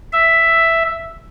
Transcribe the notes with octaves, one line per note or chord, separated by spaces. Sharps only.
E5